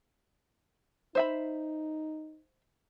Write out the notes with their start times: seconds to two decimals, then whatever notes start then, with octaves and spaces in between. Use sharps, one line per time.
1.15 D#4 C5 E5 B5